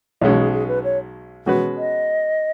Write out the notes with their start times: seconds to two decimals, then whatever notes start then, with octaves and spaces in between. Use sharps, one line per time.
0.22 B1 B2 G#3 C#4 C#5
0.38 G#4
0.53 G#4
0.68 B4
0.84 C#5
1.46 B2 G#3 C#4 F#4 B4
1.77 D#5